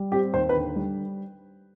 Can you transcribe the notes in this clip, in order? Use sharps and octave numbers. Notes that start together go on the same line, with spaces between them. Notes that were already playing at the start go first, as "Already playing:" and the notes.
Already playing: G3
C4 G4
D#2 C5
B4
D3
G3